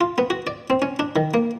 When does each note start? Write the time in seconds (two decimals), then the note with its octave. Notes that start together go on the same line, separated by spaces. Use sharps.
0.01 F4
0.18 B3
0.30 F#4
0.47 D5
0.70 C4
0.82 C#4
0.99 D4
1.16 D#3
1.34 A#3